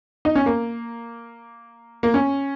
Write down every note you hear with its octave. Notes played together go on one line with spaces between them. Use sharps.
D#4
C#4
A#3
A#3
C#4